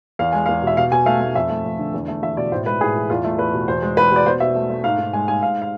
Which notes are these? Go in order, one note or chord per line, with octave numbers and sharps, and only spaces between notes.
E2 F5
G#3 G#5
E2 F5
B2 E5
B2 F5
B2 G#5
A3 F5
A3
F2 E5
A3
F2
D3
E2
A3
E2 E5
B2 D5
A2 C5
G#3 B4
A2 G#4
E3
E2 F4
A3
E2 B4
B2
E2 C5
G#3
E2 B4
B2 D5
B2 C5
B2 E5
A3
A3
G#2 F5
G#2
G#3 G#5
G#3 G#5
G#2 F5
F5